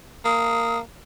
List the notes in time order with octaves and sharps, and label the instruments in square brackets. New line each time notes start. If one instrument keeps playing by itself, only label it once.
[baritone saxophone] A#3 [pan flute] D#6